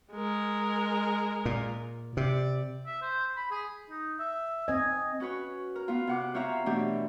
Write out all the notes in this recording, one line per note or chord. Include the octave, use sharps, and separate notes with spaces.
G#3 A#4
A#2
C3 D5
E5
C5
B5
G#4
D#4
E5
C4 D#5 G#5
C#4 F#4 B4 C#5
A#4
B3 F4
C3 F#5 D6
C4 F4 C#5 E5 A#5
B2 E3 A3 C4 D4 G4